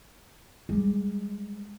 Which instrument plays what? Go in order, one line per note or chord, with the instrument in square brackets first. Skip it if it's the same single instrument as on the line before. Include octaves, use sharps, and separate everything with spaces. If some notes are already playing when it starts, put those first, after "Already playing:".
[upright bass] G3 G#3